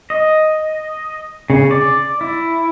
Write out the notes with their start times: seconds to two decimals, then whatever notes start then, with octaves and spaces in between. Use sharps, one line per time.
0.10 D#5
1.50 C#3
1.71 D5
2.21 E4